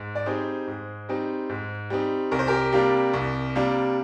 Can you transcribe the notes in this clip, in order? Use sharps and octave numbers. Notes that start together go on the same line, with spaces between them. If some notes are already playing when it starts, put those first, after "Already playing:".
Already playing: G#2
D5
G3 C4 D#4 G#4 C5
G#2
G3 C4 D#4
G#2
G3 C4 D#4
C2 A#4
C5
G4 A#4
C3 G3 A#3 D4
C2
C3 G3 A#3 D4